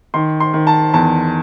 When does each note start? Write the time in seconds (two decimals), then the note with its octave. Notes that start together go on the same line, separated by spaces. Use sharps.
0.14 D#3 C6
0.40 C6
0.54 D#3
0.67 A5
0.94 E2 A5